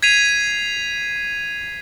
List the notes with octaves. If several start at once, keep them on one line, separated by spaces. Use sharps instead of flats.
G#6 B6 C7 D#7 F7